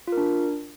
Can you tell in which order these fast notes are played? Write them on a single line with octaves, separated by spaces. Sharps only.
F4 A#4 D4